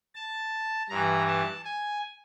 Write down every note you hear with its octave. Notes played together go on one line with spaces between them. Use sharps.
A5
G2 E3 A#5
A5
G#5